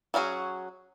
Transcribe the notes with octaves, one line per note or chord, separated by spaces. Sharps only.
F#3 C#4 F#4 G#4